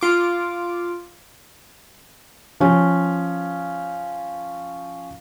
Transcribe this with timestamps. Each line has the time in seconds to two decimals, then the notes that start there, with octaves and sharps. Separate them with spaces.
0.01 F4 D6
2.60 F3 C#4